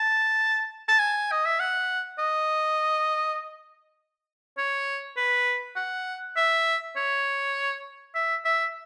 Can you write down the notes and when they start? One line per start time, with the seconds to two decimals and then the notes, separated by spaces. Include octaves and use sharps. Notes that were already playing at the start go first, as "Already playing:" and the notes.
Already playing: A5
0.88 A5
0.99 G#5
1.32 D#5
1.46 E5
1.60 F#5
2.19 D#5
4.58 C#5
5.17 B4
5.76 F#5
6.37 E5
6.96 C#5
8.15 E5
8.45 E5